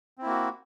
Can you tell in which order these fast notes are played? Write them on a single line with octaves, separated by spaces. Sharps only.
C4 E4 A#3 F#4